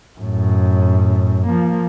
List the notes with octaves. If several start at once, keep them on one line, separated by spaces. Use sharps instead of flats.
F#2 A2
F3 A#3